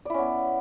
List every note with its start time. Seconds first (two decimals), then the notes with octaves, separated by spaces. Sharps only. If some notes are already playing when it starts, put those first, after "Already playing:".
0.05 D5
0.10 E4
0.14 C#4
0.19 B3